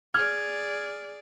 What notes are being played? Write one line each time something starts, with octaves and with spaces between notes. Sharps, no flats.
G#4 D5 F6 G#6